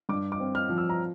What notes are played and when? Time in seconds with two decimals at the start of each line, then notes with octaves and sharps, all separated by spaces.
0.09 G2 D6
0.32 D6
0.40 C4
0.55 F6
0.69 F3
0.78 E6
0.90 A#5